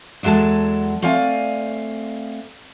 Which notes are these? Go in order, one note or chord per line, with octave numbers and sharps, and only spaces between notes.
E2 F#3 G#3 A4 A5
A3 C4 D5 F5 G#5